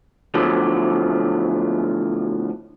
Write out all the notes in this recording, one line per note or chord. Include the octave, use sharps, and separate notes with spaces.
A2 D3 F3 F#3 B3